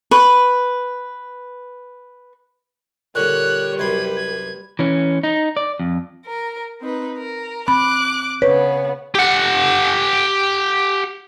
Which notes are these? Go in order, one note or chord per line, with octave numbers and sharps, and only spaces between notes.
B4 C#6
A#2 D3 G3 C#5 F#6
C2 F#2 B4 C6 G#6
G#6
E3 C#4
D#4
D5
F2
A#4
C4 D#4 B4
A#4
C4 B5 D6 F#6
C#3 B3 B4 C#5
G4 F#5